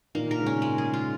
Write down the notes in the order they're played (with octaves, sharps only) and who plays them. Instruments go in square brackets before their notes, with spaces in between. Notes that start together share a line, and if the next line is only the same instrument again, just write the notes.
[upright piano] A#2 D#3 [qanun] A#3
[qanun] A#4
[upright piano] G#2 C#3
[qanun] C#4
G#3
G#4
F4